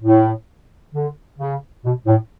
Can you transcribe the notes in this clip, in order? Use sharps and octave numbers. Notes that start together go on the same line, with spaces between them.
A2
D3
C#3
B2
A2